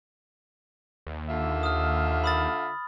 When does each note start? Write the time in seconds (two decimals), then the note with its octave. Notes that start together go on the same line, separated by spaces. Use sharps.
1.07 D#2
1.29 D3 F4 E5
1.63 D#6 F6
2.24 B5 D#6 A6